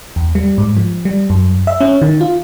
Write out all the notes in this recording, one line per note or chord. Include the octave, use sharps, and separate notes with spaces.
E2
G3
G#2
F3
G3
F#2
E5
C#4
D#3
F4